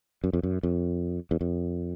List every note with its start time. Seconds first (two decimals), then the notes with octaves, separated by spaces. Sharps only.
0.24 F#2
0.33 F2
0.43 F#2
0.63 F2
1.31 E2
1.41 F2